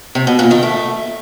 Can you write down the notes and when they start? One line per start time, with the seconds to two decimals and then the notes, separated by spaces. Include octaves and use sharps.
0.15 C3
0.27 B2
0.39 A#2
0.51 D#3
0.63 A3